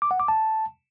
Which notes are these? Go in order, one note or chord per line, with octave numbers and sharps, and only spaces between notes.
D6
F#5
D6
A5